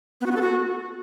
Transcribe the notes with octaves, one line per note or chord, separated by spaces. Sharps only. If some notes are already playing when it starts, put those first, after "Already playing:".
B3
F#4
B3
A4
F#4